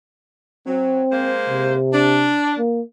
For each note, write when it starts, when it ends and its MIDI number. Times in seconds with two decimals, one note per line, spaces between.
0.67 1.04 54
0.67 1.35 60
1.11 1.75 56
1.11 1.75 58
1.11 1.75 72
1.49 2.37 48
1.93 2.57 62
2.58 2.81 58